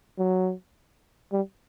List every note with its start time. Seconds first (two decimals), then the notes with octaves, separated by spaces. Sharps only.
0.19 F#3
1.32 G3